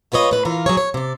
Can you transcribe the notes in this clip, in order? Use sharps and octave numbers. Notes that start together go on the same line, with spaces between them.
G#3 F4 B4 C#5 D#5
A2 B4
E3 F4 A#4 F5
F#3 G#4 C#5
C#5
C3 D5